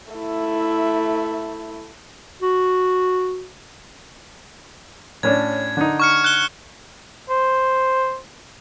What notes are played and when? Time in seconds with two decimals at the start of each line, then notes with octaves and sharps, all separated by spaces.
0.12 A3 E4
2.42 F#4
5.23 A2 C#4 D4 G#6
5.77 D3 D#4
6.00 C#6 F6 C#7
6.24 F#6 G7
7.30 C5